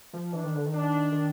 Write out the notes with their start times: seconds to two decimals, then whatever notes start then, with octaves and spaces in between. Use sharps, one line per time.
0.13 F3
0.32 E3 D4
0.44 D#3
0.55 D3
0.66 D#3
0.73 D4
1.12 D#3